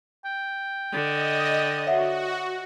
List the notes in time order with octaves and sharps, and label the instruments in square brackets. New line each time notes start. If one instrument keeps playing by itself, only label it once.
[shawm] G5
[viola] D3 [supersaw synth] D#5
[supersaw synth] F#4 [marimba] C#5 E5 F#5